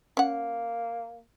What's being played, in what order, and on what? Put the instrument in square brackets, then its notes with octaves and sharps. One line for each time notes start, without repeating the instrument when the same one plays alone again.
[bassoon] A#3 [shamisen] C#4 F#5